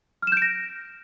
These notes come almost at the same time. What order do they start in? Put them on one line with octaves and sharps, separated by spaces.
F6 E7 G6 D7 A#6